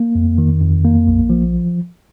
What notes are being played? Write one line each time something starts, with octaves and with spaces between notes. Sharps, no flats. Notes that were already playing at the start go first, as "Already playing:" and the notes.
Already playing: A#3
F2
D#3
F2
A#3
A#1
F3